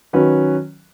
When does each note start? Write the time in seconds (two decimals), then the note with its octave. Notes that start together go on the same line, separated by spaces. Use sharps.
0.13 D#3 F#3 C#4 F#4 B4